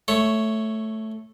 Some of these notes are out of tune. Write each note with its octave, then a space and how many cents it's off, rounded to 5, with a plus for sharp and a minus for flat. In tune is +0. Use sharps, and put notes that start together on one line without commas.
A3 +0 C#5 +0